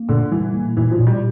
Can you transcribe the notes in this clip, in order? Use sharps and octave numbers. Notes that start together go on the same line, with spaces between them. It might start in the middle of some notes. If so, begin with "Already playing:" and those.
Already playing: A#3
A#2 D3
E3 G3
A#3
A#2 E3
F3
A#2
G3